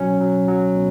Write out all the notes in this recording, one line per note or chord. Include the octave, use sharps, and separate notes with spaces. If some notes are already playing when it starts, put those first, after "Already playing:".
Already playing: B2 F#3 C#4
F#3
F#3
B2